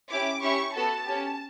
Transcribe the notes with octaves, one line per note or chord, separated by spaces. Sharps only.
C#4 E4 G4 D6
C#4 E4 G4 C#6
B3 F#4 A4 A5
C#4 G4